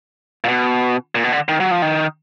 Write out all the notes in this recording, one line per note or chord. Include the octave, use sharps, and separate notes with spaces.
A#2
B2
A#2
B2
D3
D#3
F#3
F3
D#3